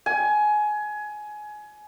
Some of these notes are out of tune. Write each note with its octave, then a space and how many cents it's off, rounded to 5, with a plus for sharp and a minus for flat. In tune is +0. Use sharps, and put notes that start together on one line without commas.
G#5 +20